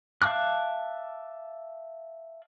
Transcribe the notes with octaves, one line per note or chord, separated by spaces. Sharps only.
E5 F5 A5 D6 F#6